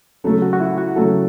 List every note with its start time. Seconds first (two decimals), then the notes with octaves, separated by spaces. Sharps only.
0.24 C#3 F#3 A3 A4
0.42 F#4
0.53 F#4
0.60 E4
0.78 F#4
0.96 C#3 F#3 A3 A4